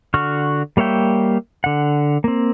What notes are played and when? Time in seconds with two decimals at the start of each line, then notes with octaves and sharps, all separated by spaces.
0.14 D3 F#4 C#6 F6
0.77 G3 A#3 C#5 E5 G5
1.64 D3 F#5
2.24 A#3 C4